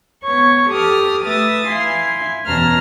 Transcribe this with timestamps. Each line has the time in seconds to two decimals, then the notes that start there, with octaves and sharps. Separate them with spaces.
0.23 B3 C#5 C#6
0.69 G4 A4 D6 D#6 F6
1.25 A3 B4 E5 D#6 A6
1.67 E4 F5 G#5 C6
2.46 E2 B2 C#4 A5 A#5 F6